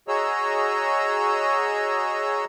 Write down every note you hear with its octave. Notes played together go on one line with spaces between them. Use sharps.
F#4 G#4 C#5 D#5 A#5 E6